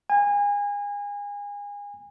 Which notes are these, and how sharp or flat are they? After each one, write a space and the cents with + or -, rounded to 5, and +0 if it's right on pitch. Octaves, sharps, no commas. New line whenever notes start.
G#5 -30